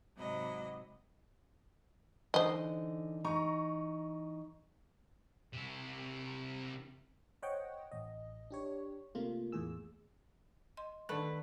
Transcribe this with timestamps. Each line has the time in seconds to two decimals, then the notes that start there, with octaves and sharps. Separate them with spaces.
0.16 G#2 C3 F#3 D#5 B5
2.34 D3 E3 D#4 C5 D#5
3.24 E3 D#4 A#5 C#6
5.53 C3 E4
7.42 C5 C#5 D#5 F#5 G5
7.92 A1 D#5
8.50 D4 G4 C#5
9.15 C3 A3 A#3 F4
9.52 E2 A2 G#4 E6
10.77 D#5 C6
11.09 D3 D#3 A3 B4